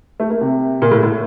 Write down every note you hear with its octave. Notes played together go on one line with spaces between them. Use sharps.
A3
A#3
C3
A#2
A2
A2